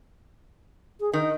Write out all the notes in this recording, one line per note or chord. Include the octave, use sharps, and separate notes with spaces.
G#4
D#3 D#5